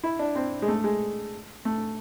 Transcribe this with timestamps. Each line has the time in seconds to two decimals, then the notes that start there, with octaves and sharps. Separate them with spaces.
0.03 E4
0.19 D4
0.36 C4
0.62 G#3
0.68 A3
0.84 G#3
1.65 A3